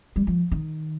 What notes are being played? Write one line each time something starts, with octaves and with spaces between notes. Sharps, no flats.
G3
F3
D#3